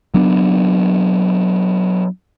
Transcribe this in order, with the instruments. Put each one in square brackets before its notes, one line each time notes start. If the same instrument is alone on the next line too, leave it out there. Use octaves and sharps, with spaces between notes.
[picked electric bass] F#3 B3 D4